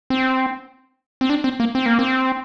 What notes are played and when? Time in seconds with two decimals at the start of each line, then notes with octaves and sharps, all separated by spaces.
0.10 C4
1.21 C4
1.30 D4
1.44 C4
1.60 A#3
1.75 C4
1.86 A#3
1.99 C4